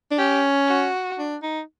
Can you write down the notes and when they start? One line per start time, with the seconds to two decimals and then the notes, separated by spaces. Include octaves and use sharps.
0.11 D4
0.18 C#4 G4
0.68 F#4
1.19 D4
1.42 D#4